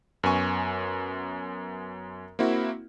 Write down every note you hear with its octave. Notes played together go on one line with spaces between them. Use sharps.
F#2 B3 G#5 C#6
A#3 C4 E4 F#4